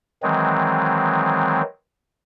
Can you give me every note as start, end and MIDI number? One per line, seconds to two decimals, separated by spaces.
0.23 1.62 51
0.23 1.62 52
0.23 1.62 54
0.23 1.62 56
0.23 1.62 60